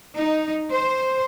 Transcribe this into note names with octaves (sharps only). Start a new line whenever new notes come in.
D#4
C5